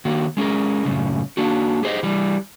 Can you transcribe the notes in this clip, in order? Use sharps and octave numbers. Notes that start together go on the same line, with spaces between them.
D#3 A#3 F#4
G#3 C#4 G#4 A#4
F#2 A2 C#3
A#3 D4 F#4
G4 G#4 C5 D5 D#5
E3 G3